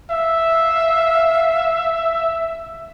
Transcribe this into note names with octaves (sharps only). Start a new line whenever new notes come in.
E5 F5